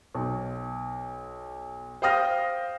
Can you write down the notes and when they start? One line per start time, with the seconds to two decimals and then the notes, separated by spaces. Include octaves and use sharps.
0.15 B1
2.02 C5 F5 G5 D#6 F6 A#6